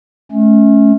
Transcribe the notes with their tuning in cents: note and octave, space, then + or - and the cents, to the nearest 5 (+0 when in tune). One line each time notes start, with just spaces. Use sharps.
A3 -30 C#4 +0